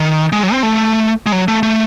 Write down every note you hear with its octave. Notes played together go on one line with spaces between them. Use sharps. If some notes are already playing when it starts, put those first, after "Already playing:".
Already playing: D#3
G#3
F#3
C4
A3
G#3
F#3
A3
A3